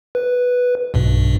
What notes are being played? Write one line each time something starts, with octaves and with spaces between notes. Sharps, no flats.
B4
B1 G2 B2